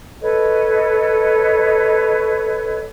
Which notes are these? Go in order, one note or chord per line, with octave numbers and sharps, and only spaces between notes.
A4 B4 C#5 D#5